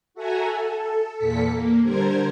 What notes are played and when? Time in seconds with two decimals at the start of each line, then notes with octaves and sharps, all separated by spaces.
0.14 F#4 A4 E5 F#5 G#5 A#5
0.48 A4
1.16 E2 A#2 A4 B6 C#7
1.49 A#3
1.83 D3 G3 A#4 C5 G#6